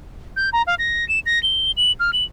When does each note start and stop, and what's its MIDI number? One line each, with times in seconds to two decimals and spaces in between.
0.36 0.50 91
0.53 0.62 82
0.67 0.75 77
0.79 1.07 94
1.08 1.19 100
1.26 1.42 94
1.43 1.71 103
1.77 1.92 102
2.00 2.11 89
2.13 2.24 102